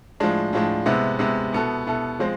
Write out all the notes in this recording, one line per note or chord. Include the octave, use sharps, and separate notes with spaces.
A2 F3 G#3 D4
A2 F3 G#3 D4
C3 G#3 B3 E4
C3 G#3 B3 E4
B2 B3 E4 A4
B2 B3 E4 A4
F3 G#3 C4